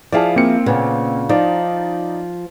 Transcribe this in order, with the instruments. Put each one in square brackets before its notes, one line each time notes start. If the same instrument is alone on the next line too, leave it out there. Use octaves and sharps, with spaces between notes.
[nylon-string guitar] F3 E4 G#4 [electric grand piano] D5 F5 A5
[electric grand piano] A#3 C4 C#7
[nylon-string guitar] A#2 C#3 B3
[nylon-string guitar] F3 [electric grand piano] D#4 D5